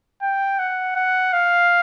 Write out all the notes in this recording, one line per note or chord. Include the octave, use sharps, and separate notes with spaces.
G5
F#5
F#5
F5